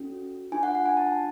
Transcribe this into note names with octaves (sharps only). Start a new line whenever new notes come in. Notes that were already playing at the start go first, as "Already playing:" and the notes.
Already playing: C#4 F#4 A4
D4 F4 G#4 G#5
F#5
F#5
G#5
A5